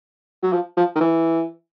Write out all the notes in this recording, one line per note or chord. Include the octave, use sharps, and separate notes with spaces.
F#3
F3
F3
D#3
E3